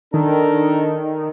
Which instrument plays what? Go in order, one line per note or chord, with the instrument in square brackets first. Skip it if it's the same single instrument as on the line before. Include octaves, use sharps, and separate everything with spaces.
[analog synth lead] D#3 [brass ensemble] D4 A4 A#4